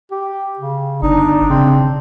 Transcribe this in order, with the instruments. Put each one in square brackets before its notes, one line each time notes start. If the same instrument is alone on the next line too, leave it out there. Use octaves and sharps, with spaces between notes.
[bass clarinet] G4
C#3
[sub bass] G1 [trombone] D4 [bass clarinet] D#4
[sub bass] C#3 [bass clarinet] C4